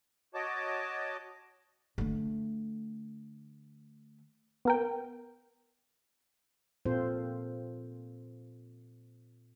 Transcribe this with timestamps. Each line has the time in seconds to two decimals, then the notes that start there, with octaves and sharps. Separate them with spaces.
0.34 F#4 C#5 D#5 A5 D6
1.98 D3 A3
4.65 B3 A#4 G5
6.86 A#2 C4 F4 A4 C5